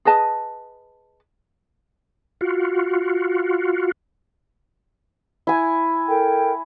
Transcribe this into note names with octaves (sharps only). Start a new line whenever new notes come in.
G#4 B4 D#5 A5
F4 F#4
E4 G#5
A4 A#4 G5